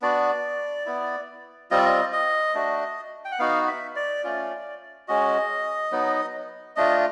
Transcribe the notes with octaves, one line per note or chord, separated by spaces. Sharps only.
B3 D4 F#4 D5
B3 E4
G3 C4 F4 D#5
D5
D#5
D#5
A3 D4 F#4
G5
F#5
B3 D#4 F#4 F5
E5
D5
A3 C#4 F4
G#3 C#4 F#4 D#5
F#3 B3 D#4
A3 D4 F4 D#5